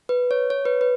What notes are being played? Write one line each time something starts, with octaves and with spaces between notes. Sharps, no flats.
B4
C#5
C#5
B4
B4